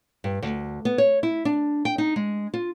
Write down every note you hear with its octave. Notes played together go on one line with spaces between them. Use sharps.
G2
D2
B3
C#5
E4
D4
G5
D#4
G#3
F4